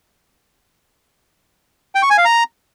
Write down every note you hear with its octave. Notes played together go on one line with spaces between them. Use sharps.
G5
C#6
G#5
F5
A#5